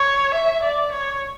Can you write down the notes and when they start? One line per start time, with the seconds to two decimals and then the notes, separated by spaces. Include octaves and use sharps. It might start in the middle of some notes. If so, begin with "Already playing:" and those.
Already playing: C#5
0.34 E5
0.63 D5
0.92 C#5